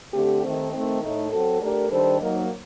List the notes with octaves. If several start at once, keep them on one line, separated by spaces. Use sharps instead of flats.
D3 A3 C4 G4
D#3 A3 C4
D#3 A3 C4
A2 A3 D#4
F#3 C4 F#4 A4
A3 D4 G4 A#4
D#3 G3 D4 A4 C5
F#3 A#3 D#4